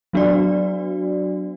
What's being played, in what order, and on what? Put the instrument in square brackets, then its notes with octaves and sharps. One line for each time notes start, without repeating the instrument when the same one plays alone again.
[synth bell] F#3 B3 D4 F#4 D5